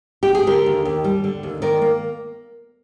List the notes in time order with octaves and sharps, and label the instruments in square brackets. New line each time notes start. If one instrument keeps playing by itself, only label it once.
[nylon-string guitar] G4
G#4
D3 G4 A#4
D#2
D#2
G3
D3
D#2
D#3 A#4 D5
A#3